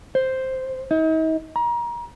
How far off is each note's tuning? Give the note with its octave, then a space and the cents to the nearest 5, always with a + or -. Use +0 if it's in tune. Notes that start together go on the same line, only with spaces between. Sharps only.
C5 +0
D#4 +40
A#5 +30